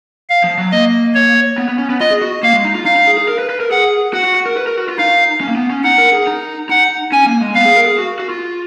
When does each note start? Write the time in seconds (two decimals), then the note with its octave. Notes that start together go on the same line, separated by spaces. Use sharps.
0.30 F5
0.44 F3
0.58 F#3
0.72 A#3 D#5
1.14 C#5
1.58 B3
1.68 B3
1.79 C#4
1.90 B3
2.00 F4 D#5
2.11 G#4
2.22 F#4
2.43 A#3 F5
2.53 G#3
2.65 D#4
2.75 F4
2.85 D#4 F5
2.96 D#4
3.07 G#4
3.18 G#4
3.28 A#4
3.38 B4
3.49 B4
3.60 A#4
3.71 G#4 F#5
4.13 F#4 F#5
4.25 F#4
4.35 F#4
4.46 A#4
4.57 B4
4.67 A#4
4.77 F#4
4.89 F4
4.98 D#4 F5
5.41 C#4
5.48 A#3
5.56 B3
5.70 C#4
5.84 D#4 F#5
5.98 A#4
6.13 G#4
6.27 D#4
6.69 D#4 F#5
7.12 C#4 G#5
7.26 A#3
7.41 G#3
7.55 B3 F5
7.65 G#4
7.77 A#4
7.86 G#4
7.98 F#4
8.19 F#4
8.29 F4